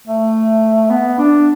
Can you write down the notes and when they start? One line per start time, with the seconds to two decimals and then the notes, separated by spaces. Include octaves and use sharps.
0.07 A3
0.90 B3
1.18 D4